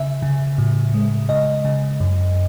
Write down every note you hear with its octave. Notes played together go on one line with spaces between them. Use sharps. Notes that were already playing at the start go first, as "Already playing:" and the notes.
Already playing: C#3 E5
C#3
A2
G#3
C#3 D#5
C#3
F#2